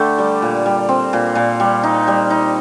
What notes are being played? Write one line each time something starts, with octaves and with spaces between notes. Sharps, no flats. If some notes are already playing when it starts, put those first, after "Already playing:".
Already playing: D3 A3 G4
G3
A#2
G3
C4
A#2
A#2
G3
D#4
G3
D#4